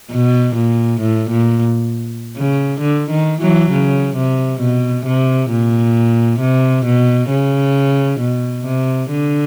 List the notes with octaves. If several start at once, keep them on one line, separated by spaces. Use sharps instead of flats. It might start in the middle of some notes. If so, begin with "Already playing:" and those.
B2
A#2
A2
A#2
C#3
D3
D#3
E3 F#3
C#3
C3
B2
C3
A#2
C3
B2
C#3
B2
C3
D3